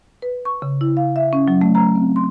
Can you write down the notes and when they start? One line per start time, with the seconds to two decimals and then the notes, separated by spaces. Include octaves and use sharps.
0.22 B4
0.45 C#6
0.62 C#3
0.81 E4
0.97 F5
1.16 E5
1.33 C#4
1.48 F#3
1.61 A3
1.75 A#5
1.96 C4
2.16 C6